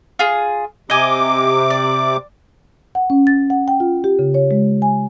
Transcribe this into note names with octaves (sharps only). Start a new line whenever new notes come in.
F4 G#4
C3 D#5 G#5 D6
D5
F#5
C#4
A6
F#5
G5
F4
G4
C#3
C#5
G#3
G#5